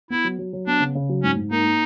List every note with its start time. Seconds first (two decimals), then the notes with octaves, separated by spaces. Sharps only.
0.10 B3 E4
0.24 F#3
0.39 F#3
0.53 F#3
0.67 B3 D4
0.80 C#3
0.95 C#3
1.09 F#3
1.23 G#2 C#4
1.37 G#2
1.51 A#3 D#4
1.64 A#3